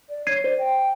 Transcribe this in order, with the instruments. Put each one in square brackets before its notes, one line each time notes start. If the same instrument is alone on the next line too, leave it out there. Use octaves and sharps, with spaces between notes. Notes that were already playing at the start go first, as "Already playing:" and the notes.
[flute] D5
[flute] C#5 [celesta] G#6 C7 D#7
[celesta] C5 [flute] D5
[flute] G5